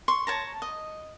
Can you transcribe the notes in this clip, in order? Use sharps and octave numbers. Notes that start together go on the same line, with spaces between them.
C6 C#6
C#5 A5 A#5
D#5